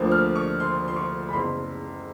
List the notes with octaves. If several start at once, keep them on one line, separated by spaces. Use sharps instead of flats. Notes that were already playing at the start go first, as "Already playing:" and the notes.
Already playing: D2 D3 F3 A#3
F6
C#6
C6
C6
C#6
B5
F#1 E2 C#3 C6